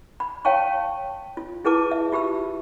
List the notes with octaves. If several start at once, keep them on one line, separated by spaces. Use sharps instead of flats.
B5
C#5 F5 G5 A5 C#6
F4
E4 G#4 B4 A5 D6
E5
F4 G4 B5 E6